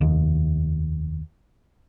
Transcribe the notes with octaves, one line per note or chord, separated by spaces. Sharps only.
F1 D#2